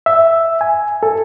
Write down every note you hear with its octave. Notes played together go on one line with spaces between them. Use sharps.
E5
G#5
A4